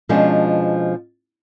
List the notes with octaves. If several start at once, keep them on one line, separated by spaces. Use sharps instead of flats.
B2 F3 G#3 C#4 D4